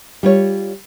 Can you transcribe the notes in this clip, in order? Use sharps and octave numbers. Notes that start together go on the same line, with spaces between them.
G3 F4 C#5